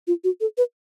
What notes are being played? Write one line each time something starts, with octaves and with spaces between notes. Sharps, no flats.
F4
F#4
A4
B4